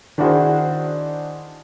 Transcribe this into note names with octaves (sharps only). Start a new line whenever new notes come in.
D#3 D4 E4 F#4 G#4 C5